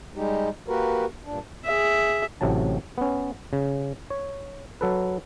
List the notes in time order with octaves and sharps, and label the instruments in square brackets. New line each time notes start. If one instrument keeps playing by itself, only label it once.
[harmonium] G3 G#3 D#4 G4
A#3 F#4 G4 A#4 B4
G2 A#2 D4
[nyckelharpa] G#4 E5
[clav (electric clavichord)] A1 A2 C3 F#3 A5
B3 C#4
C#3
C#5
F#3 A4 B4